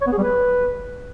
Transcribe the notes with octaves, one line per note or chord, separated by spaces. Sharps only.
C#5
B3
G#4
G3
B4